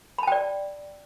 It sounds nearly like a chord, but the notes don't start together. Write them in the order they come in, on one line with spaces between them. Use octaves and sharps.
B5 A5 G5 D5